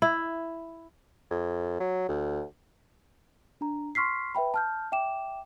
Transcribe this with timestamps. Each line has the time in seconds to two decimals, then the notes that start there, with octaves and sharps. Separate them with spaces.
0.02 E4
1.31 F2
1.80 F#3
2.09 D2
3.61 D4 A#5
3.95 C6 C#6 F6 B6 C7
4.35 B4 E5 G5 B5
4.54 A5 F6 G6
4.92 E5 G5 D6 E7